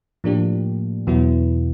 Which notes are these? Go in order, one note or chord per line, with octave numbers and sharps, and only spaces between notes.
A2 F3 A#3 D4 G4
E2 B2 F#3 B3 E4